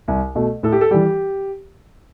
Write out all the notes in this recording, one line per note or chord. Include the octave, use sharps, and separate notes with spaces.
C2
B2 A3
A2 A4
G4
A4
E3 G3 G4